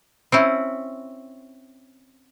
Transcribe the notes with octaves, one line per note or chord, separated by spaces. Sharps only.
C4 C#4 E4